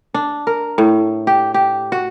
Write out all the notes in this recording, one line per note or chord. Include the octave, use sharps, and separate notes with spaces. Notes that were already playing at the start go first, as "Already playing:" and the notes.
D4
A#4
A2
G4
G4
F#4